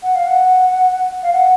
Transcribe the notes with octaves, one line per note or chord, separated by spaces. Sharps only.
F#5
F5
F#5
F5
F#5